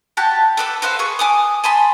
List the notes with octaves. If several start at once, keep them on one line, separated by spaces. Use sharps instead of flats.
F#4 G4 A5 F#6
A4 B4 D6
F#4 B4 C5 F5
G#4 B4 C#6
G#5 D6 D#6
G#5 A5 B5 C6